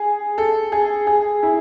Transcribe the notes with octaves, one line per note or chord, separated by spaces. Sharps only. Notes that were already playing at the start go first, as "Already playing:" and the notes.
Already playing: G#4
A4
G#4
G#4
E4